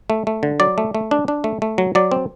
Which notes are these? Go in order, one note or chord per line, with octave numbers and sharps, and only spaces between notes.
A3
A3
D3
F#3 D5
A3
A3
D4
D4
A3
A3
F#3
F#3 D5
C4